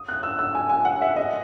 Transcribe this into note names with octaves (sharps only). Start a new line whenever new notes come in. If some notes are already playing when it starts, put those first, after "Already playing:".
Already playing: D#6
F#6
E6
E6
G#5
G#5
F#5
E5
D#5